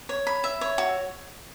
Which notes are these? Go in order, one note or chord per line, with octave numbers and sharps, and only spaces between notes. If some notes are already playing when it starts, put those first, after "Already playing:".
C#5
B5
E5
C#5
F#4